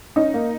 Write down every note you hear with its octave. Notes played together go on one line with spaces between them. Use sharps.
C#4 D#4
A#3